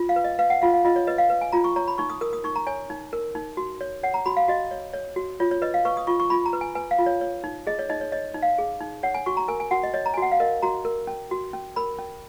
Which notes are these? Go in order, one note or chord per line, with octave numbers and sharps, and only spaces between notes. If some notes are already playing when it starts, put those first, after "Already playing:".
Already playing: F4
F5
B4
D#5
B4 F5
F#5
F4 F5
F5
F4 D#5
C#5
B4 D#5
F5
B4
G#5
F4 A#5
C#6
C#5 A#5
B5
D#4 C#6
D#6
A#4 D#6
D#6
D#4 C#6
A#5
C#5 G#5
D#4
A#4
D#4
F#4
C#5
C#5 F#5
A#5
F#4 B5
F5
F#4 D#5
C#5
C#5
F#4
F4 C#5
C#5
B4 D#5
F5
B4 C#6
D#6
F4 C#6
C#6
F4 B5
A#5
B4
G#5
B4 G#5
F5
F4
C#5
C#5
D#4
G#4 D#5
C#5
D#4 D#5
C#5
C#5 D#5
D#4
F5
G#4
D#4
C#5 F#5
G#5
F#4 C#6
A#5
A#4 G#5
G#5
F#4 F#5
D#5
C#5 D#5
A#5
G#5
F#4 F#5
F5
A#4 D#5
F#4 A#5
A#4
C#4
F#4
C#4
A#4 B5
C#4